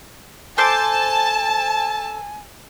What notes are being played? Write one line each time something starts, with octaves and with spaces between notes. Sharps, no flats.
A4 C5 G#5 A5 D6